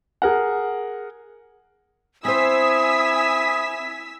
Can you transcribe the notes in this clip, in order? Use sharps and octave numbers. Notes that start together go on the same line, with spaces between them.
G#4 A#4 F#5
C4 E4 C5 G#5 D#6 E6 B6